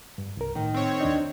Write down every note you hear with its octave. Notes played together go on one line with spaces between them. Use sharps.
G2
C2 A#4
A2 D#3
C4 C#5
D#2 D4 D#5